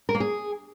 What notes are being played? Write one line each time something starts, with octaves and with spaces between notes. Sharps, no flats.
A#4
A#3
G#4